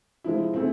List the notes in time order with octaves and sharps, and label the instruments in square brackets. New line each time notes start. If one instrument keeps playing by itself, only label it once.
[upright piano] C3 F3 G#3 [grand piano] E4
[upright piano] B2 A3 E4 G#4 [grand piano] C4